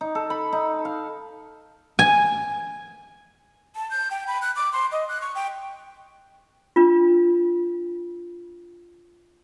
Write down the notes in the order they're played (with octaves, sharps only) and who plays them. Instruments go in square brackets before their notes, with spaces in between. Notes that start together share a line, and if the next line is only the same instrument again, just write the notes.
[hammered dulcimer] D#4
A4
B5
D#4
F5
[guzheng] G#5
[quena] A5
G6
G5
B5
F#6
D6
C6
D#5
F#6
C#6
G5
[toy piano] D4 F4